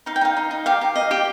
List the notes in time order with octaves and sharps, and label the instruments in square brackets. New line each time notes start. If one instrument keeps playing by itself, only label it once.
[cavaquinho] D#4 F5
G5
D#4 F5
D#4
D#4
G4 F5
G4
D#5
G4